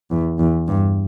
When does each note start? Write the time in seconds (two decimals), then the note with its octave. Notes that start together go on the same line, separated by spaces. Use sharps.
0.11 E2
0.39 E2
0.68 G2